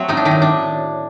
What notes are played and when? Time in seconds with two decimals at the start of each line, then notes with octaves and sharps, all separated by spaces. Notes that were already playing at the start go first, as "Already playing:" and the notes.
Already playing: F#3 A3 C4 F#4 C5
0.08 A2 D#4
0.17 D4
0.25 D#3 D#4
0.31 A2
0.42 D4